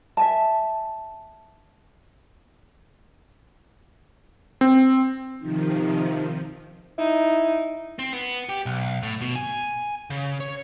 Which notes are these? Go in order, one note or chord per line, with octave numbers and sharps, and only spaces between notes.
E5 G#5 A5
C4
C3 D#3 F3 D#4
D#4 E4
C4
B3
G4
B1
A2
B2
G#5
C#3
C#5